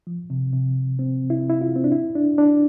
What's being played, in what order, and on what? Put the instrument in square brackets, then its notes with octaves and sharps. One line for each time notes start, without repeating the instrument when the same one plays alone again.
[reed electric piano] F3
C3
C3
C4
E4
E4
F4
C4
D4
E4
D4
D4